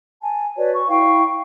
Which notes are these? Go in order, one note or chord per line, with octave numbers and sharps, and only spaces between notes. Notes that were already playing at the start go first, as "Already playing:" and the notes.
G#5 A5
F#4 B4 C#5 D5
C#6
E4 F5 G5 C#6